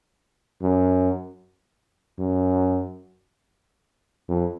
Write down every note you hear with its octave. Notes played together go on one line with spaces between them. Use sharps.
F#2
F#2
F2